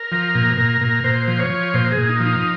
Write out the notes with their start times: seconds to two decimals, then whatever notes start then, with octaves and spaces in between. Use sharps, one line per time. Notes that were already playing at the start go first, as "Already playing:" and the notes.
Already playing: A#4
0.12 F3
0.35 A#2
0.57 A#2
0.81 A#2
1.04 A#2 C5
1.28 F3
1.39 C#5
1.50 F3
1.74 A#2 C5
1.91 G#4
1.97 A#2
2.08 D#4
2.20 F3
2.26 D#4